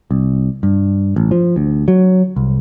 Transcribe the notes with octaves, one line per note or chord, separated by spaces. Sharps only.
C2
G2
A1
F3
D2
F#3
C2